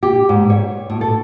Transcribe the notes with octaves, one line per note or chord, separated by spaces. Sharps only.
G4
G#2
C#5
A2
A4